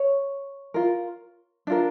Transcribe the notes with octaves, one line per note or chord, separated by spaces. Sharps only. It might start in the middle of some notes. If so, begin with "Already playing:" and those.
Already playing: C#5
F4 A#4
D4 F4 A#4